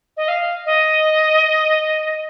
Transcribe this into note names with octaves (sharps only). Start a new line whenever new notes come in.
D#5
F5
D#5